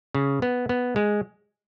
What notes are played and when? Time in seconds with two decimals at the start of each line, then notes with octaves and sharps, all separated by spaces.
0.15 C#3
0.42 B3
0.69 B3
0.96 G#3